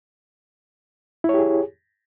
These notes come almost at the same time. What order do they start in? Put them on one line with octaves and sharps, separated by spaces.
E4 C#5 G4 G#4